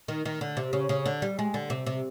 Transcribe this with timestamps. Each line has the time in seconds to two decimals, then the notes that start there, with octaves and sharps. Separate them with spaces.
0.08 D#3
0.25 D#3
0.41 D3
0.57 C3
0.73 C#3
0.89 C#3
1.06 D3
1.22 G3
1.39 G#3
1.54 D3
1.70 C3
1.86 C3